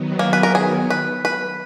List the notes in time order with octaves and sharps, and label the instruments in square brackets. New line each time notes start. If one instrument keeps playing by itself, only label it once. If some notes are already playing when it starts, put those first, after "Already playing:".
Already playing: [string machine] D#3 F#3 B3
[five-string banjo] A#3
B4
A#4
G#4
B4
B4